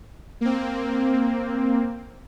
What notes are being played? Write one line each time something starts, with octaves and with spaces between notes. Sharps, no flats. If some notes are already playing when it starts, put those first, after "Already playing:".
A#3 C4